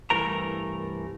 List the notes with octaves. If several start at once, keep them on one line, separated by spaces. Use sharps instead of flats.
C2 G2 E3 A3 A#4 A#5